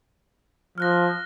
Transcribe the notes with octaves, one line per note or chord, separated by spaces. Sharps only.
F3 F6 F#6 A#6